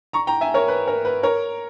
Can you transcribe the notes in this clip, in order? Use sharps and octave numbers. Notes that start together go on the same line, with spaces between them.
A#5 C#6
G5 A#5
E5 G#5
A#4 C#5
B4
A#4
B4
A#4 C#5